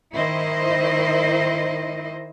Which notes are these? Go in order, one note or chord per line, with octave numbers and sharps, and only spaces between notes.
D#3 E4 C5 D#5